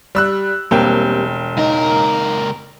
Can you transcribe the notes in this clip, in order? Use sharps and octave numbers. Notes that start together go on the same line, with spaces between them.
G3 E6 F#6
E1 G3 A#3 C4 G5
C#2 D#4 A#4